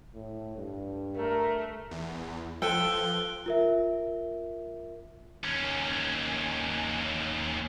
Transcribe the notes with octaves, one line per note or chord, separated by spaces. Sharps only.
A2
G2
A3 A#4
E2
F3 A4 B4 G5 F#6 D7 G7
F4 A#4 E5
D#2 C#4